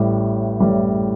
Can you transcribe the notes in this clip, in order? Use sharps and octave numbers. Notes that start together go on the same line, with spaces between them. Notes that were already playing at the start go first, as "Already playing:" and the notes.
Already playing: A1 A2 G3
A1 A2 G3